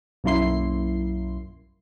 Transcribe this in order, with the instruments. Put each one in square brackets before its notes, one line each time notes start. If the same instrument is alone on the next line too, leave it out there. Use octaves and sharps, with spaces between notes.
[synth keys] B1 F#2 A#3 E4 C6 C7